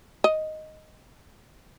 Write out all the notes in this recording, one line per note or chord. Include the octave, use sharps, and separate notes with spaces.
D#5